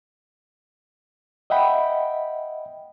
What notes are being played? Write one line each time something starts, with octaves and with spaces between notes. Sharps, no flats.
D#5 E5 F#5 G5 B5